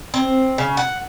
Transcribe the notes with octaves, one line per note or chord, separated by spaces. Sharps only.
C4
C#3
F#5